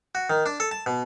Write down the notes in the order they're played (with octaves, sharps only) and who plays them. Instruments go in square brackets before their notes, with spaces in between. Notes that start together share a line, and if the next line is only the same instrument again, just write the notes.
[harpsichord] F#4
D#3
D4
A4
A5
B2